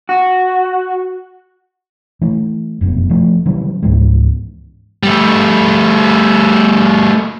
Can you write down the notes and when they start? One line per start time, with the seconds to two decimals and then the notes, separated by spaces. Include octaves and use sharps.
0.09 F#4
2.21 E3 A3
2.81 F1 F#2 B2
3.09 E3 F3 A3
3.45 C#3 E3 F#3 G3
3.82 C#2 G#2 E3 G#3
5.03 G3 A3